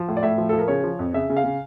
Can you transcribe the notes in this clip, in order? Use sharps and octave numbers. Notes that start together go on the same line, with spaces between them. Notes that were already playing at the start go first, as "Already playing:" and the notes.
Already playing: F3
A2
D5
A2 E5
F3
F3 A4
A#4
C#3 C#5
F3
F2
C#3 E5
C#3
F5
C#3